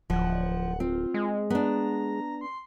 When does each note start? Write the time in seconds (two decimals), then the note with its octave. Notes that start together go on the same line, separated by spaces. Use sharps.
0.10 D1 F3 F#5
0.80 C4 F4
1.14 G#3
1.50 B3 D4 A#5
2.41 C6